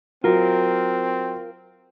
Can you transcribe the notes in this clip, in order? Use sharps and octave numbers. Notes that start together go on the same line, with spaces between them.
F#3 C4 F4 A#4